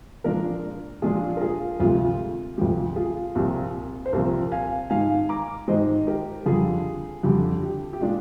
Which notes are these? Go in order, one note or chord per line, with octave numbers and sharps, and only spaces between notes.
A#2 F3 G#3 D4 A#4 D5
A#2 F3 G#3 D4 F4 G#4
A#4
F4 G#4
D2 C3 F3 G#3 F4
D2 C3 F3 G#3 G4
F4 G#4
C2 A#2 F3 C4
C5
C2 A#2 F3 C4 G4 A#4
F5 G#5
G#2 D#3 G#3 F5 G#5
A#5 D6
G#2 D#3 G#3 C5 D#5
G4 A#4
F2 D3 G3 F4 G#4
F2 D3 G3 G4
G4
G4
A#2 G#3 D4 F4